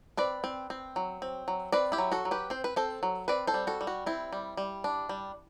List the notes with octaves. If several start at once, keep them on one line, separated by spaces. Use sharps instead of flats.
C4 B4 D5
C4
C4
F#3
C4
F#3
C4 B4 D5
E4 G4
F#3
F#4 A4
F#3
G4 B4
C4 C5
B4
C4 A4 C5
F#3
C4 B4 D5
A4 C5
G3
F#4 A4
G3
F#4
C4 E4
G3
G3
D4
G3